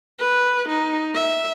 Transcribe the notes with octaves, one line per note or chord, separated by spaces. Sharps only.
B4
D#4
E5